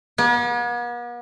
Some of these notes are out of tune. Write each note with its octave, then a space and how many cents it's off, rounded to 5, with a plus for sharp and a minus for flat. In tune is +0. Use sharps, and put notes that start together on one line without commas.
B3 -45